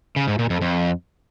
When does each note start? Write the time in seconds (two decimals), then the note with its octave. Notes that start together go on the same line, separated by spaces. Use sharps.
0.16 C#3
0.28 G#2
0.39 A#2
0.50 F2
0.61 F2